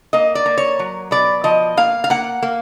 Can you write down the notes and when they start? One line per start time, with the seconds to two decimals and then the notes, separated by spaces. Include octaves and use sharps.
0.13 A#3 D#5
0.35 D5
0.46 A#3
0.58 C#5
0.79 F#3
1.11 B2 D5
1.44 F3 D#5
1.77 A#3 F5
2.04 F5
2.10 A#3 F#5
2.43 A#3